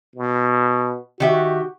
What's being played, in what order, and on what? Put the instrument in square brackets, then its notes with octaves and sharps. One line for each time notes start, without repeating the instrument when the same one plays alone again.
[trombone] B2
[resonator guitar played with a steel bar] D#3 G4 E5 [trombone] F#4